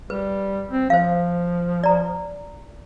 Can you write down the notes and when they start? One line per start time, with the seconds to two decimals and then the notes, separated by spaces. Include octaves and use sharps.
0.10 G3 B4
0.71 C4
0.90 F3 C5 F5
1.84 D5 A#5